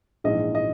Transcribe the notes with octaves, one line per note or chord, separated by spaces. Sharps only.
A#1 G#2 E3 D#5
D#5